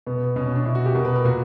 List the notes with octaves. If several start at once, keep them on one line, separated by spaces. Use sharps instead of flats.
B2 B3
B2 C#4
C#4
D4
B2 E4
F#4
G4
B2 A#4
B4
A#4
A#2 F#4